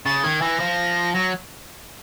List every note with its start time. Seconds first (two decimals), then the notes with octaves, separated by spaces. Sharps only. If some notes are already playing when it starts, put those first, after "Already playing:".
0.06 C#3 A6
0.24 D#3 G#6
0.42 E3 A#6
0.60 F3
1.14 F#3 A#6